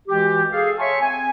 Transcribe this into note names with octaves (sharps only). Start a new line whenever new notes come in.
E3 G#3 F#4 G4
G#4 A4 F5
C#5 E5 G#5 A5 C6 C#6
C4 G#5